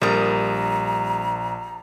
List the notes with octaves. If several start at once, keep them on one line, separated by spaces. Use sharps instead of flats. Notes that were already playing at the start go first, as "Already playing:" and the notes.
A#1 G3 A#4 A#5 D#6